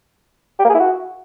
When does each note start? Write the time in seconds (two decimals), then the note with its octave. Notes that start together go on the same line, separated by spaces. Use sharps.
0.60 G4
0.65 A#3
0.70 G#4
0.75 E4
0.80 F#4